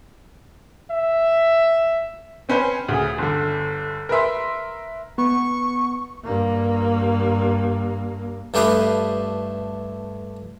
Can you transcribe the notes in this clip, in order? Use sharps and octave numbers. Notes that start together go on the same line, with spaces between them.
E5
C4 C#4 B4 C5 G#5
D2 C#3
G1 D3
A#4 B4 E5 C6
B3 C#6
G2 A#3
G2 A3 G4 B4 F5 D#6